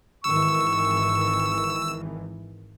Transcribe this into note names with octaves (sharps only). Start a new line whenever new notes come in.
G#1 D#3 E3 C#6 E6